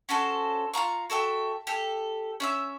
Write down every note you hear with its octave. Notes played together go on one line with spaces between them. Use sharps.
C#4 F#4 A4 C5
F4 F5 A#5 C#6
F#4 A4 E5 G5
G4 A4
C#4 E5 E6